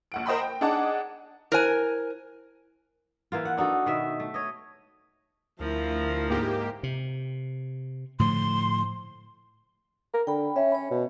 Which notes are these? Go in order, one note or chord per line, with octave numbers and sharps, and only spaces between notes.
A#1 F#5 D7
A#4 C5 D#5 G5 B5 C6
G5
D4 D#4 G#4 F#5 A5 D6
E4 A#4 C5 G#5
E3 A#3 F4
F#5
D4 D#4 F#4 A4
B2 D#3 E5
A3
C#5 D#5
D2 F3 E4 A#4
G#2 A#3 G4
C3
A2 D3 F3 C6
A#4
D3 G5 B5
C#4 E5
C#5 B5
B2